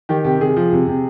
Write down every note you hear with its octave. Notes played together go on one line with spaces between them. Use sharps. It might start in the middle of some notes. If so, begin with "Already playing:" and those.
D#3 G4
C3 G4
C3 G#4
F3
C3
C3